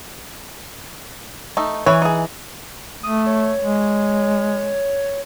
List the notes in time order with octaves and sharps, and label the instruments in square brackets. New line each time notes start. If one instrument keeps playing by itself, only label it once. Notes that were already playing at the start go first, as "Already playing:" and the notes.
[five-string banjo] A3 D#4
[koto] E3 [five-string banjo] E4 C#5 G#5
[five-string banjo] D#4 G#4
[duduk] A3 [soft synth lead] D#6
[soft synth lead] C#5
[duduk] G#3